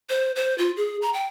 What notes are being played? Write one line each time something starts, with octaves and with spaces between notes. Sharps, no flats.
C5
C5
F4
G#4
A#5
G5